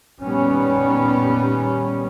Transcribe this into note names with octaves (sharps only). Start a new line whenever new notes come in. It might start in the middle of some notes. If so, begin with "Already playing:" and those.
A#2 D#3 G3 B3 C#4